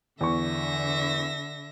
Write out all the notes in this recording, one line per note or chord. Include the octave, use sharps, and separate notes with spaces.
E2 D3 E5 C#6 A#6